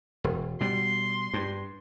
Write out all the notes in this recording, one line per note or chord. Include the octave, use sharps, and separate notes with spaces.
E1
B2 G3 C6
G2